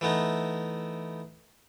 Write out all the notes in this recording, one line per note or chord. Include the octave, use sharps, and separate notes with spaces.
E3 A3 B3 D#4